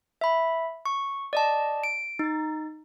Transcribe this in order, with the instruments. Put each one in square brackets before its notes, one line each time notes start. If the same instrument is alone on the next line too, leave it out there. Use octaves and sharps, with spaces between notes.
[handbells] E5 B5
C#6
D5 D#5 A5
D7
D#4 A6